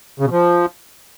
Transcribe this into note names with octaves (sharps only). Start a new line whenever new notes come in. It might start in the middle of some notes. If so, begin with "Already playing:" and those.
C#3
B2
F3